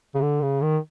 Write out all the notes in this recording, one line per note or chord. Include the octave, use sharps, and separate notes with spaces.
C#3
D3
C#3
D#3